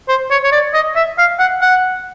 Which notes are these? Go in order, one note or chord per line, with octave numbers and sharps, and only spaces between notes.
C5
C#5
C#5
D5
D#5
E5
F5
F#5
F#5